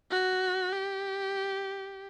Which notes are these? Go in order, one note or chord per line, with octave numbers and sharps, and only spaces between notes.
F#4
G4